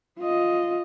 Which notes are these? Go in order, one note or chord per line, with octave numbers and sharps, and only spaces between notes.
F4 D#5